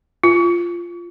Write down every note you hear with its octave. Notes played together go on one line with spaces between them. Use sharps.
F4